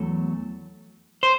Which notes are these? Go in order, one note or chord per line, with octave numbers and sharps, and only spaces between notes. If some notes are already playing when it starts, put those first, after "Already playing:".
Already playing: E2 F#3 A3
C5